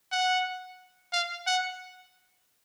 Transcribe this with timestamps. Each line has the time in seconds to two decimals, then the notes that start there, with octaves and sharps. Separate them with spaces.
0.12 F#5
1.12 F5
1.46 F#5